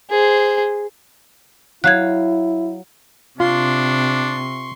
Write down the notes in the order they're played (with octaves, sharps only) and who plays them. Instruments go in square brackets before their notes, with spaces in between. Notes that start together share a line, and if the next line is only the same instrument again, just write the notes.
[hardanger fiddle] G#4 C5
[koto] F#3 F5 [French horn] E4 [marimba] F#6 G#6
[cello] C3 [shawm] D4 [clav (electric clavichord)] F4 [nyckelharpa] C6 C#6